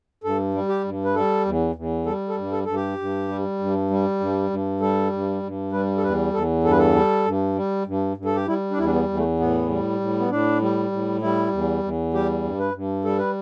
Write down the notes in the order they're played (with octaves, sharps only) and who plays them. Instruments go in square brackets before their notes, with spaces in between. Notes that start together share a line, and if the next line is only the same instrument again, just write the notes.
[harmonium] G2 A4
G3
G4
G2
B4
G3 A4
E2
E2
G3 A4
A4
G2
A4
G2 A4
G4
G2
G3
G2
G3
G2
G2
G3 A4
G2
G2
G3 B4
A4
E2 B4
E2 A4
G2 A4
B4
A4
G3
G2
G3
G2
G2
A4
G4
G3 E4
D4
E2 E4
D4
B3
E2
A3
A2 B3
G3
A2
B3
A2 D4
G3
A2
G3 E4
E2
E2
G3 G4
G2
B4
G2
G3 A4
B4